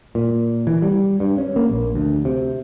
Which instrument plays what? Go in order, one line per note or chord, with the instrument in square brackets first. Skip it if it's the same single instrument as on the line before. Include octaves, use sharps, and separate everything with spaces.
[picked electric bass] A#2
E3
G3
G2
C#4
A#3
A#1
D2
C3